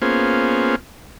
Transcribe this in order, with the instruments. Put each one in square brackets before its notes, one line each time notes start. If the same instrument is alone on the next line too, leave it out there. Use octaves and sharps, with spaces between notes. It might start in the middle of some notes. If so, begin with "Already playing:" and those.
[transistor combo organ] A#3 B3 C#4 F4 G#4 C5